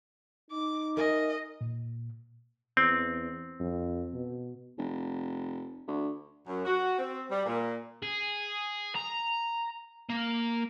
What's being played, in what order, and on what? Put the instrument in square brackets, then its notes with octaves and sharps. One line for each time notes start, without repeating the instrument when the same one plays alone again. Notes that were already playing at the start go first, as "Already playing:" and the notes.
[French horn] D#4 [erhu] D6
[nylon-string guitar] A#4 E5 G#5 [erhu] D#5
[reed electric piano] A#2
[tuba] E2 [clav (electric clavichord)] C4
[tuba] F2
B2
[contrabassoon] F1
D2
[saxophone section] F#2
F#4
C4
G3
A#2
[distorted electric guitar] G#4
A#5
A#3